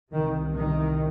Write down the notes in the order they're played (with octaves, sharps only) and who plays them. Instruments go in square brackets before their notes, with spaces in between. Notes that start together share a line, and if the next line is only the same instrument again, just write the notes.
[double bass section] C2 C3 D#3
D#3